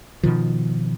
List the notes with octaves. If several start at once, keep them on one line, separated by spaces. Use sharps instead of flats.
B2 D#3 F3